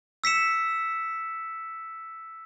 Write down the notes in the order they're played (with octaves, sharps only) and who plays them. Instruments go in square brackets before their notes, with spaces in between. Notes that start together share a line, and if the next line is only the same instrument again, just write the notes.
[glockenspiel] E6 B6 C#7 E7